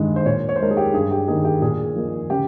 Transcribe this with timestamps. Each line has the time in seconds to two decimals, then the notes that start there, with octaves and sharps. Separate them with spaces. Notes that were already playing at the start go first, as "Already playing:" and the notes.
Already playing: G2 D#3 G#3
0.16 C5
0.25 A#2 C#5
0.49 C#5
0.56 C5
0.60 G#3 D#4 A#4
0.70 G#4
0.77 G4
0.93 G2 G#4
1.11 G4
1.28 D#3 A#3 D#4 G#4
1.45 G4
1.62 A#2 G#4
1.96 F3 A#3 D#4
2.30 C#3 G4